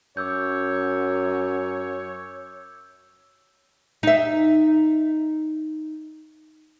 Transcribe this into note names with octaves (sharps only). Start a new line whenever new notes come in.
F#2 C#5 D6 E6 G6
D#4 E5